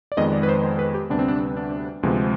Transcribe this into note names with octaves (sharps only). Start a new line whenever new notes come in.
D5
F2 D#3 G#3 B3 D#5
D5
B4
C5
C5
B4
G4
D2 C3 G3 B3 D4
C4
D4
D4
D2 C3 F3 G#3 B3